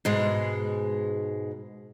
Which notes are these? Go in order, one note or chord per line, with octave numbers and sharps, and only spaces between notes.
G#2 B2 G#3